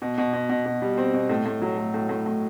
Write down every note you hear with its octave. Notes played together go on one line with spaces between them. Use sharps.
B2
B2
B2
B2
B2
G3
C4
B2
A2
A2
F#3
A2
A2
A2
A2